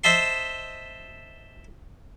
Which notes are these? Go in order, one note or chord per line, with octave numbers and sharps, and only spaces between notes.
C5 D#5 E5 A5 C6